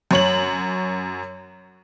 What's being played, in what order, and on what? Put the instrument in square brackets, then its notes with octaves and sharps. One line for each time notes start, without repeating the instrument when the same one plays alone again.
[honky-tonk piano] F#2 C#5 F#7